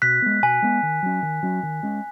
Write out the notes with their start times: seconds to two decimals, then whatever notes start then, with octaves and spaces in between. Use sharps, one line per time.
0.02 B2 F#6 B6
0.22 G#3 B3
0.42 B2 G#5
0.62 G#3 B3
0.83 D#3
1.03 F#3 C#4
1.23 D#3
1.43 F#3 C#4
1.63 D#3
1.83 G#3 C#4